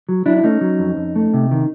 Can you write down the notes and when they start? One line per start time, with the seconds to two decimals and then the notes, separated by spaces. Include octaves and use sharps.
0.09 F#3
0.26 F#3 D4 E4
0.37 D4
0.44 A3 C#4 D#4
0.61 F#3
0.79 F2
0.97 F2
1.16 A3
1.34 C3
1.51 D#3